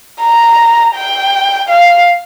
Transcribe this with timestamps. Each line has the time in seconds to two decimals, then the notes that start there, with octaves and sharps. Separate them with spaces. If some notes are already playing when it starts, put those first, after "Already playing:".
0.21 A#5
0.95 G5
1.69 F5